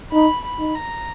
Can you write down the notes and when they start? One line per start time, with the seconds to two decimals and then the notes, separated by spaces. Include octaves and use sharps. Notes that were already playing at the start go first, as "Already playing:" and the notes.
0.13 D#4 B5
0.44 B5
0.59 D#4
0.75 A#5